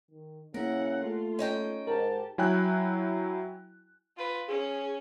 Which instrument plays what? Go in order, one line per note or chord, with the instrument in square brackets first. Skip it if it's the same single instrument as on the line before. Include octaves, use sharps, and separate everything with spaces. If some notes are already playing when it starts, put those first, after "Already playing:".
[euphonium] D#3
[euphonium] C#3 [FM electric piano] A#3 [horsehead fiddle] E4 F#5 [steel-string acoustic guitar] A#4
[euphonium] A3 [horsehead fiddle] F4
[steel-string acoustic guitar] C#4 D#4 G5
[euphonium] G#2 [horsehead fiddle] G4 A5 [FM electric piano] A#4
[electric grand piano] F#3 E4 G5 G#5 F#6
[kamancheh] F4 B4
[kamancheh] C#4 [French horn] G#4